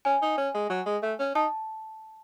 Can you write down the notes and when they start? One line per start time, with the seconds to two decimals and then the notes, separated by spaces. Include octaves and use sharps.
0.05 C#4 G#5
0.22 D#4
0.38 C#4
0.54 G#3
0.70 F#3
0.86 G#3
1.03 A3
1.19 C#4
1.35 D#4 A5